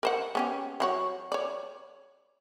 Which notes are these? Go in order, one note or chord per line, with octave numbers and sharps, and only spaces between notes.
A#4 C5 F#5
B3 C#4 G4
F#3 F#4 C#5
C#5 D5